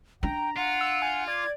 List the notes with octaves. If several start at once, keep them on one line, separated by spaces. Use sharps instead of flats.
D4 G5 A#5
F4 F#5
E6
G#5
D5 G#6